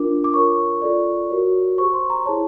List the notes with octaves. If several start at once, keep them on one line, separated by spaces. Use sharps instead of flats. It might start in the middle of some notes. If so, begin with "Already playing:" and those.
Already playing: D4 F4 A#4 D6
D6
F4 A#4 C#5 C#6
F4 A4 D5
F#4 A#4 C#5
G4 C5 C#6
C6
A#5
E4 G#4 C#5 A5